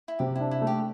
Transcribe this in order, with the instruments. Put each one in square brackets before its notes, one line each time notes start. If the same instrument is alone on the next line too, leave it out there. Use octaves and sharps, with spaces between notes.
[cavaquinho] E4
[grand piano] C3 [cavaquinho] G4
[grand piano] D4 [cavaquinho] E4
[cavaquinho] E4
[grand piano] A3
[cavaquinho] G4